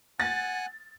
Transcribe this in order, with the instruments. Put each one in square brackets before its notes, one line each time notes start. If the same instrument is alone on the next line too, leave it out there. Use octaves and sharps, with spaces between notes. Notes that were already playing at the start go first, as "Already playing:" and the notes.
[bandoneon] F#5 G#5 F#6 [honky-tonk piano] A6